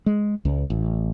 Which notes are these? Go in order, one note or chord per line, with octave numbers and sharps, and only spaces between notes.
G#3
C#2
A1